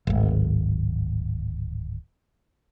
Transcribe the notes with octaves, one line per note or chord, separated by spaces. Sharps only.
D1 G#1